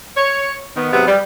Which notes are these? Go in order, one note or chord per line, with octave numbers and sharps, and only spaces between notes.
C#5
D#3 B3
G#2 C3 F#3 B3
G3